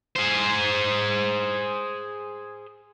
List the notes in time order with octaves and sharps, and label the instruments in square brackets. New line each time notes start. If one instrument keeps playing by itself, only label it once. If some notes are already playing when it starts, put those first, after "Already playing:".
[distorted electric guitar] G#4 C5